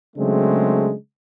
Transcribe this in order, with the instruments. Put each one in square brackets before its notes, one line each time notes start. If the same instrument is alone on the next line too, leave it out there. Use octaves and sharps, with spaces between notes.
[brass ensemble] C#3 F#3 G#3 A3 C4 D4